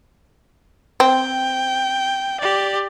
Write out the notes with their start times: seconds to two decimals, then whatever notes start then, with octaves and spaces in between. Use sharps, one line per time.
1.00 C4 G5
2.40 G4 D5